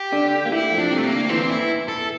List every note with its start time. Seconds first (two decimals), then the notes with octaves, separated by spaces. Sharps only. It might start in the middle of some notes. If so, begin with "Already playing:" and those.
Already playing: G4
0.12 D3 D4
0.45 A#3
0.51 A2 A3 E4
0.71 F2 F3
0.78 D4
0.90 C2 C3
0.98 A3
1.04 A#3
1.10 D2 D3
1.29 E2 E3 C4
1.50 E4
1.88 A4